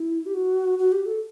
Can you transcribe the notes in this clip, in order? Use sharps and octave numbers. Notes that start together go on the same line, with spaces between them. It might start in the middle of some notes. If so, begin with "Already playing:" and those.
Already playing: E4
G4
F#4
F#4
G4
A4